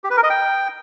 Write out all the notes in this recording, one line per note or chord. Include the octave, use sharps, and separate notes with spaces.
G4
B4
A#4
D#5
G5